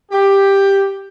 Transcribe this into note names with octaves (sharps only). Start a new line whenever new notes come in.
G4